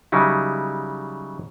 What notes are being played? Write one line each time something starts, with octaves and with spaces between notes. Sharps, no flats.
C#3 F#3 G3 D#4 E4